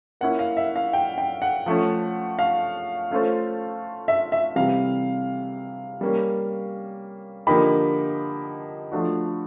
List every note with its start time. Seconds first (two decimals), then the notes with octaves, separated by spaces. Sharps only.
0.21 A#3 C#4 E4 F#5
0.39 F5
0.57 E5
0.76 F5
0.93 G5
1.18 G5
1.42 F#5
1.66 F3 A3 C#4
2.39 F5
3.11 A3 C#4 F4 A4 C5
4.08 E5
4.32 E5
4.56 C3 E3 G3 F5
6.01 G3 A#3 C#4
7.47 D3 F3 A#3 D#4 G4 B5
8.92 F3 A3 D4 F#4